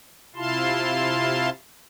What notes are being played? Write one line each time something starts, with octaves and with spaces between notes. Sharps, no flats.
C3 E4 F4 F5 A5 C6